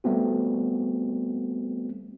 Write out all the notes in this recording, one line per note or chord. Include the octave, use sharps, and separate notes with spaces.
G3 A3 B3 C4 F#4